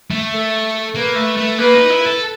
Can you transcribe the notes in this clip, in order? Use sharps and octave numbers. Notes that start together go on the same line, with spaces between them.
A3
A4
A#3 B4
A3
A3
A#3 B4
D#4
E4
A4